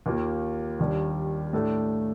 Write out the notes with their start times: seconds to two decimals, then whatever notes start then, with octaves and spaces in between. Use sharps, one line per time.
0.06 D#2 D#3 A#3 F4
0.79 D#2 D#3 G3 D4
1.53 A2 A3 D4 A4